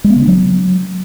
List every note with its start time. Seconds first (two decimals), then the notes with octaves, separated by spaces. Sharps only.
0.04 G#3
0.10 B3
0.16 C#3
0.22 D4
0.28 F#3